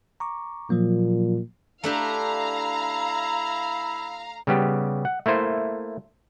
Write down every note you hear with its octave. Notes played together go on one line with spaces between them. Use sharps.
A#5 C#6 D6
A#2 F3 F#3 A#3
A3 D4 E4 G4 F5 A#5
C#3 G3 B3 G4
F#5
A3 A#3 E4 C5